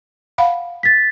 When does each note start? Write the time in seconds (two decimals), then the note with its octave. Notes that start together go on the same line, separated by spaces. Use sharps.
0.38 F5 F#5 B5
0.83 A6 B6